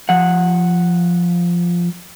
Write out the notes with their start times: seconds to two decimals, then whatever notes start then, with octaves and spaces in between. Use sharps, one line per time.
0.09 F3 F#5